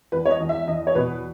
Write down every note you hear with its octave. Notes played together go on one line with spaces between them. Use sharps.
E2 B4
C#5
D#5
E2
E5
E2 D#5
C#5
B2 B4